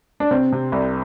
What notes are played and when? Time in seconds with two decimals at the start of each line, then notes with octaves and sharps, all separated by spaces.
0.20 D4
0.31 C3 C4
0.52 C3
0.72 C2